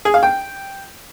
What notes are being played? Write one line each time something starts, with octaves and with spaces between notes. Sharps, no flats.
G#4
F5
G5